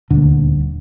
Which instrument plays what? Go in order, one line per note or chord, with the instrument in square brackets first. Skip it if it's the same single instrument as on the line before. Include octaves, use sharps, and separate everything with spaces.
[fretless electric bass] D#1 [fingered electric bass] D2 D3